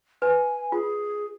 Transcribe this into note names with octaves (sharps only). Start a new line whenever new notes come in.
B4 G#5
F4 G#4